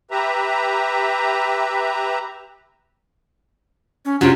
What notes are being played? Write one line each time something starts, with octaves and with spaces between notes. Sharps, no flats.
G4 B4 E5 A#5
C#4
F#2 C3 D4 F4